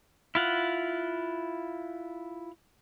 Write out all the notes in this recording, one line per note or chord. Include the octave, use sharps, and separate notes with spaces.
E4 F4 F#5